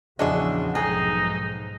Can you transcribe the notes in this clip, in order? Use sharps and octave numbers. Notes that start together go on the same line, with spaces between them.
A#1 E2 C#3 D4 F#4 G#4 D#5 E5
B1 F2 G#2 D#4 G#4